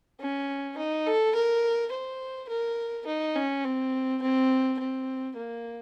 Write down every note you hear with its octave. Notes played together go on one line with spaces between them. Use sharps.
C#4
D#4
A4
A#4
C5
A#4
D#4
C#4
C4
C4
C4
A#3